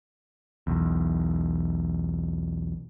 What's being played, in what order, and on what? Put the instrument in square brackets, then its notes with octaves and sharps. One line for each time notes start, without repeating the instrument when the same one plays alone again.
[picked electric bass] B1 E2